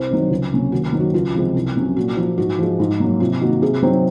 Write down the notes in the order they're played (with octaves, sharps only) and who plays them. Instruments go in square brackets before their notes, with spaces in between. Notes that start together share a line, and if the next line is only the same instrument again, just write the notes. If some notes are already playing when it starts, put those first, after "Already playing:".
Already playing: [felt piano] C2 C5
C3 D#3 F#3
C#2
C3 F#3 A#3 C#4
D#2 F#4
F#4
D#3 F#3 C4
F#4
C#2 F4
C3 F3 G#3 C4
C2
C3 F#3 C#4
A#2 F#4
F3 A#3
G#2 F#4
F3 G#3
G#2
F#3 A#3
C3 F4
D#3 A#3 F#4
C3 G#4
F#3 C4 D#4